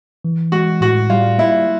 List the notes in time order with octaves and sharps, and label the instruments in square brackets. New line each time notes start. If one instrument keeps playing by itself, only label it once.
[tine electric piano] E3
[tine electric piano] G#3 [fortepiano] F#4
[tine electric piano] A2 [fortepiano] F#4
[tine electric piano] G3 [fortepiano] F4
[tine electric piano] A#3 [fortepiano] E4